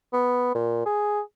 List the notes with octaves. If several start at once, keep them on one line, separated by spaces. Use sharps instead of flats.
B3
A#2
G#4